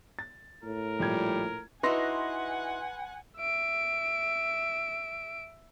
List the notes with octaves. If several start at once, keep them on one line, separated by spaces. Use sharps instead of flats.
A6
A2 A#4
A#1 A#2 G3 G#6
D#4 E4 F#4 B4 F#5 G#5 C6 A#6
E5 D7